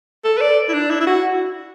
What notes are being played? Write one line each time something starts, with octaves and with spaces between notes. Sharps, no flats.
A4
B4
D5
E4
D4
E4
E4
F#4